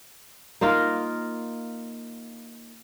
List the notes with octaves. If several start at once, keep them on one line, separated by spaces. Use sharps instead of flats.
A#3 D#4 F4 A#4